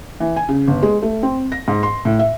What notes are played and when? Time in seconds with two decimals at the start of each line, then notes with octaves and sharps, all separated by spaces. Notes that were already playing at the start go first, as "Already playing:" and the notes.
0.20 E3
0.36 G#5
0.49 C#3
0.68 G1
0.83 G#3
1.02 A3
1.23 C4
1.52 A#6
1.68 G#2
1.83 C6
2.05 A2
2.19 E5